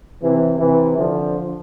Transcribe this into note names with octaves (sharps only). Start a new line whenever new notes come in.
C3 E3
C3 E3
D3 F3